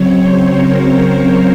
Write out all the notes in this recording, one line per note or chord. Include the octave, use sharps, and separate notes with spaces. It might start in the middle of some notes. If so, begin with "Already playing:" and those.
Already playing: C#3 F#3 C4 C#5
C5
A#4